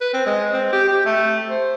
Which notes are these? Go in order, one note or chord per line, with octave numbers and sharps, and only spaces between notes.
B4
C4
G#3
C4
G4
G4
A3
C5